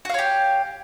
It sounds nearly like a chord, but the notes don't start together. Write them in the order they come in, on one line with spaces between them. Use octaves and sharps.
F#4 F5 C#5 G4